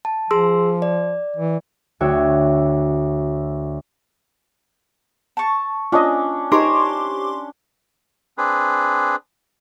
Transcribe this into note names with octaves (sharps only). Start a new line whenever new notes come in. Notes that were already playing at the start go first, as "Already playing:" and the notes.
A5
F3 G#4 C6 E6
D5
E3
D2 F#4 C#5 G5 E6
A5 C#6
C#4 D4 F4 D#5
D#4 G4 A#4 C5 C#5 C6 D6
C4 D4 G#4 B4